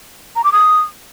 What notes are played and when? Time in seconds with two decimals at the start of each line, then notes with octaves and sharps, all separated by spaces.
0.36 A#5
0.44 D6
0.52 D#6